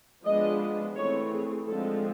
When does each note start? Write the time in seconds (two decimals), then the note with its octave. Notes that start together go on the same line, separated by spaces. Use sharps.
0.25 F3 G#3 B3 D4 D#5
0.96 E3 A3 C4 C#5
1.32 G#4
1.67 D3 F3 G#3 C4 A4